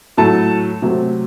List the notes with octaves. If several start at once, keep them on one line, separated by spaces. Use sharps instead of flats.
A2 F#3 A3 A4 A5
C3 F#3 A3